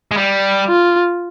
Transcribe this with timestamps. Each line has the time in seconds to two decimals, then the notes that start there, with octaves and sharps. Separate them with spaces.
0.11 G#3
0.17 G3
0.68 F4